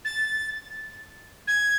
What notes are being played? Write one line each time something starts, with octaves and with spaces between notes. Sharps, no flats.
A6
G#6